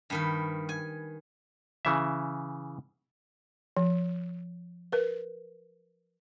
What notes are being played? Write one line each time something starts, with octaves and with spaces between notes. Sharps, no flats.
G2 D#3 B4
G#5
C#3 E3 E5
F3
A#4 B4